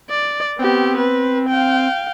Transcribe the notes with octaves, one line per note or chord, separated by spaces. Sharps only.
D5
B3 C4 G4
B4
F5 G5